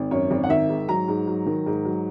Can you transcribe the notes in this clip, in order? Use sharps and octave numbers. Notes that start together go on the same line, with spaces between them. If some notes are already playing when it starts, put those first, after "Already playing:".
Already playing: G#1
F#2 C#5
G#1
F#5
D#3 E5
G#2
F#3 A#5
G#2
F#3
D#3
G#2
F#3